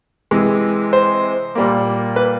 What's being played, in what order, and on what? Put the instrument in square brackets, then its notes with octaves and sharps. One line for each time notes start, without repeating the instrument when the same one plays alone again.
[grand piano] C3 E3 G#3
C5
A#2 G3 A#3
B4